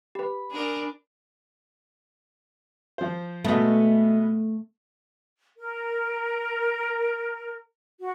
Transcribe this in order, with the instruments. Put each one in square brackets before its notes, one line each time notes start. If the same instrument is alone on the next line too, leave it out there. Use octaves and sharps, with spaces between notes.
[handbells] G4 B4 [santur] B5
[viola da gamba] D4 [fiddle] G#4 A#4
[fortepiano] F3 C5
[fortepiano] B2 G#3 B3 [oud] A3
[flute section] A#4
F#4